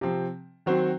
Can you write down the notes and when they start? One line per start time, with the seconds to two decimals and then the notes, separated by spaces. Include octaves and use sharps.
0.01 C3 F3 C4
0.66 D#3 F#3 C4 F#4 C5